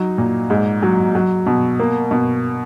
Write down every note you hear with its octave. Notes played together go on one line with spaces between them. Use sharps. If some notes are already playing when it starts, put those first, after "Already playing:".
Already playing: F#3 D#4
A#2
G#2
F#3
F#3
B2
A#3
B2